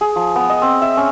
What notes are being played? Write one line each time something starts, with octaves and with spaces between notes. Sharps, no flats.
G#4
F3
B3
D#5
C4
E5
C#4